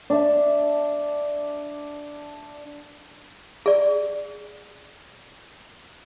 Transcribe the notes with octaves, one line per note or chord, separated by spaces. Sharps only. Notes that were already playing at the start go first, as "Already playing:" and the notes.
D4 E5
G#4 D5